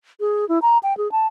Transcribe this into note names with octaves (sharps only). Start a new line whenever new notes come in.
G#4
E4
A#5
G5
G#4
A5